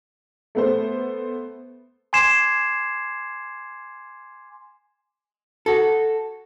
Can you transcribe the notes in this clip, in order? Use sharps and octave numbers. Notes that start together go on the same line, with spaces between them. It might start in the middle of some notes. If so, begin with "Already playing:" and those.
A3 B3 C5
G#5 C6 D6 G#6 C7 E7
F#4 A4